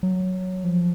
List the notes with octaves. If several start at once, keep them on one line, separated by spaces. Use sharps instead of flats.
F#3
F3